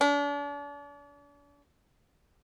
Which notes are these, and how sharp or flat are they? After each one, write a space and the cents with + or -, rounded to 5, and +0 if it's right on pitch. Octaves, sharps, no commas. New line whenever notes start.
D4 -40